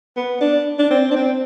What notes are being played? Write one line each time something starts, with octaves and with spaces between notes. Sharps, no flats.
B3
D4
D4
C4
D4
C4